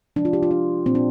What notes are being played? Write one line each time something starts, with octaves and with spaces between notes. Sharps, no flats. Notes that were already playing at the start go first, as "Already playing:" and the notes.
C3 F3 G#3 D4
F4
G4
F4
D4
A#2 F3 A#3 C4
D4